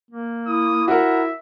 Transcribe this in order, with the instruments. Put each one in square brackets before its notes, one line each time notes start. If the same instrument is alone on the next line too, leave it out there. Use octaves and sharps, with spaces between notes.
[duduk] A#3
[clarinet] E4 [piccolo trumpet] D#6
[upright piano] F#4 A#4 [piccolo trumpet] E5